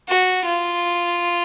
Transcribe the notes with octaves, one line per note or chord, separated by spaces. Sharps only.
F#4
F4